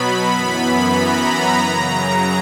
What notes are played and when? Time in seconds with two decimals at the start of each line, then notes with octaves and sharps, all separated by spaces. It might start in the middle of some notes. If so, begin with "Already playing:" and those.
Already playing: B2 F#3 B3 B5
0.30 F#2 E3 B3
0.94 A#5
1.58 F#2 C#3 F#3